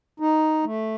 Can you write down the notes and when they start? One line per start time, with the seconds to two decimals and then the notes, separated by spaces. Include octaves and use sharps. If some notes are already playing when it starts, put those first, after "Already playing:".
0.20 D#4
0.64 A3